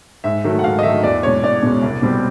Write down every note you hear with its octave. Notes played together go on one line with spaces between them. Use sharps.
G#2 E5
D#3 F#3 A3
F#5
G#2 F5
D#5
D#3 F#3 A3 E5
E2 D5
B2 G#3 C#4 C#5
E2 D5
B2 G#3 C#4
C2
B2 G3 C4